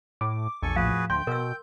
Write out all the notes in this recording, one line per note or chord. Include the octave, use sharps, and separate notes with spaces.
A2 D6
A#1 E2 A4 G#5 C#6
A2 F3 F#4 G#4 B4 F5
D2 G5 C6 G6
B2 A#4 E6